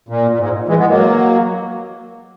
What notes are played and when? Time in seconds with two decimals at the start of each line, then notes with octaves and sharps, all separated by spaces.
0.09 A#2
0.31 A#2
0.39 G#2
0.68 E3 G#3
0.78 G#3 B3
0.89 F#3 A#3